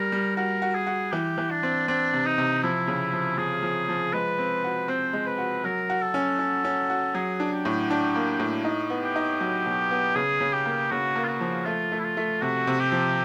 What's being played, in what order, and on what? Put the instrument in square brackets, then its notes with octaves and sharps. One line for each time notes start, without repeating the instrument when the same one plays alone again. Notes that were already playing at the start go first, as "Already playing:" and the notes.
Already playing: [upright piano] G3 [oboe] A#4
[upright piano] G3
[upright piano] F#4 [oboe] A#4
[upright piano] F#4
[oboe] G#4
[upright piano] F#4
[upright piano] E3 [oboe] G4
[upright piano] E3
[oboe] D4
[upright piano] C4
[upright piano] C4 [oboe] D4
[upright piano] C3
[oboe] D#4
[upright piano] C3
[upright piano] F3 [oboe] E4
[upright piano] C#3
F3
[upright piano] F3 [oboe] G#4
[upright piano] F3
F3
[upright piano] G#3 [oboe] B4
[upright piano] C4
F#4
[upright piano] C4 [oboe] C5
[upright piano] G#3
[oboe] B4
[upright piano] F#4
[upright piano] F#3 [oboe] A#4
[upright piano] F#4
[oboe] A4
[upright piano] C#4
C#4
C#4
F#4
[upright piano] F#3 [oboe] G#4
[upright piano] D4
[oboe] G4
[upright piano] A2
D4
A#3
A2
D#4
B3
[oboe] G4
[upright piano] D#4
F#3
B2
B3
[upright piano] C#3 [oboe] G#4
[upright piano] C#3
[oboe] G4
[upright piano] A#3
[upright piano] C#3 [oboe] F#4
[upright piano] A#3
[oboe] F4
F#4
[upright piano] F3
[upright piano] A3 [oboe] F4
[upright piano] A3
[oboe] E4
F4
[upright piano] A3
[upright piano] C3 [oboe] F#4
[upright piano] C3
[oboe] G4
[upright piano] F3